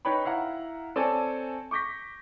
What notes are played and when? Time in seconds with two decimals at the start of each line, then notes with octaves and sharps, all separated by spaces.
0.05 D#4 B4 C#5 G5 B5
0.25 E4 F5 F#5 A#5
0.96 C4 A4 C#5 D5 G#5 A5
1.71 C#6 D6 G6 A#6 B6